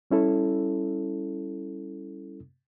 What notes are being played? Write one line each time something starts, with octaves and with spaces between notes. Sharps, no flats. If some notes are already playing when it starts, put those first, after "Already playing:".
G3 C#4 E4 A4